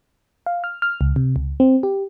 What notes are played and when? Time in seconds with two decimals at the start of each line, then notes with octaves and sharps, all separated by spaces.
0.46 F5
0.64 F6
0.82 F6
1.01 C#2
1.16 C3
1.36 C#2
1.60 C4
1.83 G4